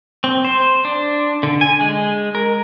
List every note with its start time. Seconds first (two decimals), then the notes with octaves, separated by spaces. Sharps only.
0.24 C4
0.45 C5
0.85 D4
1.43 D3
1.61 G#5
1.81 G#3
2.35 A#4